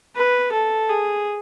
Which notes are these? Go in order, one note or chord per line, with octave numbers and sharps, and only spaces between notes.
B4
A4
G#4